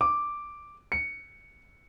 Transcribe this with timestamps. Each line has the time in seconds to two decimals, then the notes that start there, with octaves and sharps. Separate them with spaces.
0.01 D6
0.92 C#7